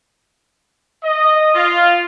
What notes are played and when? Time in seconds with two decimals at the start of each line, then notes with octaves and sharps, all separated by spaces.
1.04 D#5
1.55 F4